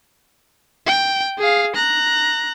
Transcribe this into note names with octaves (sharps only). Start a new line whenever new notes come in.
G5
G#4 F5
A#5 F#6